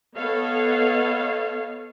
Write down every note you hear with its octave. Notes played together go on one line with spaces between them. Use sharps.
B3 A4 C#5 D#5 F5